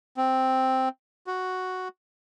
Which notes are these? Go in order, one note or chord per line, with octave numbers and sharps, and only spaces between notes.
C4
F#4